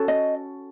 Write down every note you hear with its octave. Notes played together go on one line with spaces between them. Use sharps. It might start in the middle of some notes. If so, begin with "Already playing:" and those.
Already playing: C#4 F#4 A4
D#5